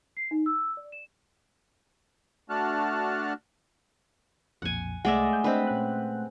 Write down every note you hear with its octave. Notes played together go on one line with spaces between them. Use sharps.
C7
D#4
E6
D5
E7
A3 D4 F#4 A5 F6 F#6
B1 F2 A#2 F#5 G#5
C2 G#3 A3 D5 E5 F#5 A#6
G6
C4 D4 B4 D#5
A#2 C#4 F#6